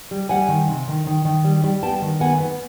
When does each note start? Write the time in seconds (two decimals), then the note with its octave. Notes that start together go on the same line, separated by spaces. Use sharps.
0.11 G3
0.29 G3 F#5 G#5
0.48 D#3
0.68 C3
0.88 D#3
1.07 D#3
1.25 D#3
1.45 G3
1.64 G3
1.83 B3 G5 A5
2.02 D#3
2.20 B3 F#5 G#5
2.40 B3